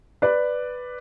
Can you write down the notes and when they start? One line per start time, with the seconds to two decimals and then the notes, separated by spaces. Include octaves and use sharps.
0.22 B4 D5